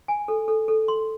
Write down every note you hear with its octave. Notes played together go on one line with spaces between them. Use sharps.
G#5
A4
A4
A4
C6